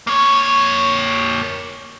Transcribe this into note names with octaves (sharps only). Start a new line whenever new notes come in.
A#3 C#5